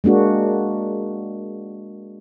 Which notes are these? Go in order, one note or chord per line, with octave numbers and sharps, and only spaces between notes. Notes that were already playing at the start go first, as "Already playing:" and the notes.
G#3 A#3 D4 F#4